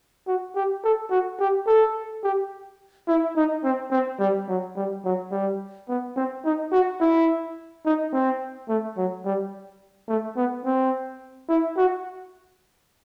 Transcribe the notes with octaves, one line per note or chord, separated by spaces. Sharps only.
F#4
G4
A4
F#4
G4
A4
G4
E4
D#4
C4
C4
G3
F#3
G3
F#3
G3
B3
C4
D#4
F#4
E4
D#4
C4
A3
F#3
G3
A3
B3
C4
E4
F#4